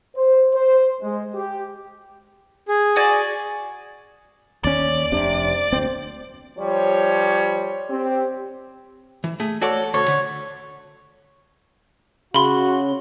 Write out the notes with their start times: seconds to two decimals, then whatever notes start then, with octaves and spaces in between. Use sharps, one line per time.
0.15 C5
0.53 C5
1.01 G#3
1.34 G4
2.68 G#4
2.96 F#4 D5 G#5
4.64 D#2 C#4 D5
5.12 F1 C3 D4
5.72 D2 C4
6.58 F3 G3 C#5
7.89 C4 G4
9.24 E3
9.40 A3 G#4
9.62 F#4 A4 C#5 D5
9.94 D2 A4 C#5
10.08 D3
12.34 C#3 F#4 B5 C6